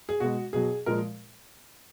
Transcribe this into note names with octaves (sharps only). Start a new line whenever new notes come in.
G#4
B2 G#3 F#4
B2 F#3 G#4
A#2 F3 G#3 A#4